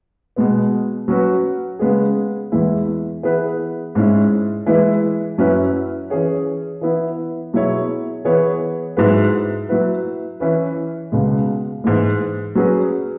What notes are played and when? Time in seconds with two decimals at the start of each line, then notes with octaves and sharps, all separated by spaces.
0.36 B2 G#3 B3
1.08 F#3 C#4 F#4 B4
1.79 C#3 G#3 B3 G#4
2.52 E2 E3 G#3 E4
3.23 E3 B3 E4 G#4 B4
3.95 G#2 G#3 C#4 E4
4.66 E3 G#3 E4 B4
5.38 F#2 F#3 C#4 E4 B4
6.10 E3 C#4 G#4 C#5
6.81 E3 B3 E4
7.53 B2 F#3 E4 G#4 C#5
8.25 E3 B3 G#4 C#5
8.97 G#2 F#3 E4 G#4 B4
9.69 F#3 E4 B4
10.40 E3 C#4 E4 B4
11.12 C#2 B2 G#3
11.84 G#2 E3 G#3
12.55 F#3 C#4 G#4 B4